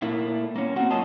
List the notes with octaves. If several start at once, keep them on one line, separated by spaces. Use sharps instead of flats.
A#2 A3 A#3 E4
A#3 C#4
C4 F#4 F#5
F#2 A#3 C#4 F4 D#5 A5